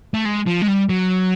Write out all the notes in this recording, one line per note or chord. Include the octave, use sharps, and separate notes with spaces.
A3
G#3
F3
G#3
G3
F#3